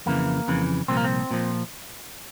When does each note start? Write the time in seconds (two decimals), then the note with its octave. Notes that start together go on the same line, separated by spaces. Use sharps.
0.06 F2 C#3 E3 A#3
0.48 F2 C#3 E3
0.88 C2 A#2 F3 C4
0.97 A#3
1.04 C4
1.31 A#2 F3